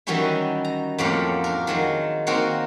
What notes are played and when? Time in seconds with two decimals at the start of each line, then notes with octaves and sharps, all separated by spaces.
0.07 D#3 E3 F#3 G3 C#4 E4
0.65 A#5
0.98 F2 A2 F#3 A#3 G4 F5
1.44 D4 A#4
1.67 D#3 F#3 G#3
2.27 D#3 A#3 C4 F#4 A#4 C#5